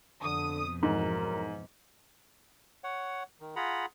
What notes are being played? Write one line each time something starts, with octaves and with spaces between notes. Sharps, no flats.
F2 B2 D3 D#6
B1 E2 G#2 F#3 A#4
C#5 F#5
D#3
F4 G#4 F#5 A#5 B5